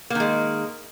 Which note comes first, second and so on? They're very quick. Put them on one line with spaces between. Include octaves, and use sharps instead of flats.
A#3 D#3 G#3